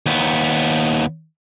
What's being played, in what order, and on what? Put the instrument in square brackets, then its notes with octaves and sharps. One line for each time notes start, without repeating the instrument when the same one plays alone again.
[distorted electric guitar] D#2 B3